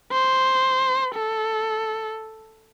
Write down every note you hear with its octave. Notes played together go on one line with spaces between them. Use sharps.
C5
A4